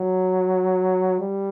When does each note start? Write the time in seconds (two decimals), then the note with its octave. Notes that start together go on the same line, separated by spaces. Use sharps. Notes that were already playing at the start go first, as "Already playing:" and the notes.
Already playing: F#3
1.20 G3